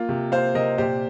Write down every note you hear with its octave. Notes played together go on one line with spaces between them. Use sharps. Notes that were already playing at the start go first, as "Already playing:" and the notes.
Already playing: A#3 F4
C3
A#3 C5 F5
C3 A#4 D#5
A#2 G4 C5